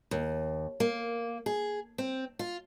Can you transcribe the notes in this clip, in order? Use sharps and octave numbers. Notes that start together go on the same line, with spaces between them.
D#2
A#3
G#4
C4
F4